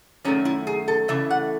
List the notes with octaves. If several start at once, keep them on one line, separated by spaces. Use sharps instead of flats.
F#2 D#3 A3 C#4
E4
G#4
A4
C#3 E3 A3 E5
F#5